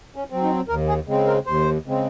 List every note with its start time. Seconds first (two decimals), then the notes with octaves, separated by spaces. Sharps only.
0.16 C#4
0.30 F#3 C4
0.43 D#4
0.68 D#2 A#4
0.88 G#4
1.07 C#3 G#3 C4
1.27 A#4
1.46 D#2 C5
1.86 C#3 G#3 C4